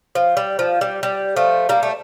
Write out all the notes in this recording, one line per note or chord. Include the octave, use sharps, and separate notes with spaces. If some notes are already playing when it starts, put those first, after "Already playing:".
F3
G3
F3
G3
G3
F3 A3
G3 A#3
A3